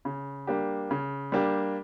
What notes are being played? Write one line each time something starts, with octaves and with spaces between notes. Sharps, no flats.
C#3
G3 A#3 D4 G4
C#3
G3 A#3 D4 G4